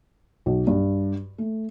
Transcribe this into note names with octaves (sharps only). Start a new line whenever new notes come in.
B1
G2
A3